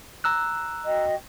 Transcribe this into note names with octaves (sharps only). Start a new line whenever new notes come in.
A#5 E6 F#6
F#4 D#5 G5